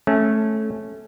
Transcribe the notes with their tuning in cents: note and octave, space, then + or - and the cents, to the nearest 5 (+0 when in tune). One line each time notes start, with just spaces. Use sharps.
A3 -10 C#4 -15